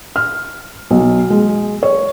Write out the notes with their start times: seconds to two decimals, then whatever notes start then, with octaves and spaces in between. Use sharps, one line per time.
0.16 F6
0.91 B1
1.30 G#3
1.83 C#5